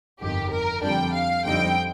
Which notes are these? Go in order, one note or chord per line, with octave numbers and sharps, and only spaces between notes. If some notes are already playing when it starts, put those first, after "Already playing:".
G1 F2 D#3 G4
A#4
F2 D3 G3 D4 G5
F5
F2 D3 G3 C4 D#4 G5